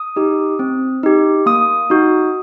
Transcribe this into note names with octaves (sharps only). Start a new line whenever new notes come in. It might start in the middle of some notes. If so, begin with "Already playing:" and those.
Already playing: D#6
D#4 G4
C4
D#4 G4
A#3 D#6
D#4 F#4